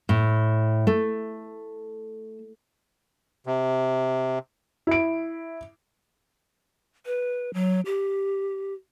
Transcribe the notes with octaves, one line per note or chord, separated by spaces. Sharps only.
A2
A3
C3
E4 D7
B4
F#3
G4